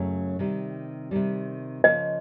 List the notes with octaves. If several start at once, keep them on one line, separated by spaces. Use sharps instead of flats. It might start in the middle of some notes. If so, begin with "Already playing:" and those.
Already playing: F#2 C#3 F#3 A3 C#4
C3 D#3 G3
C3 D#3 G3
C#3 F3 A#3 D#5